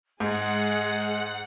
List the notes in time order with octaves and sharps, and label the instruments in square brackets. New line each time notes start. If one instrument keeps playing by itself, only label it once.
[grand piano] G#2 [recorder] G#3 [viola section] G#4 [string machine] F#5